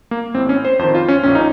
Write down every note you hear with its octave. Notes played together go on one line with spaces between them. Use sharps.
A#3
A1 A2 C4
C#4
C5
F2 D#3 C5
F4
C#4
A#1 A#2 C#4
D#4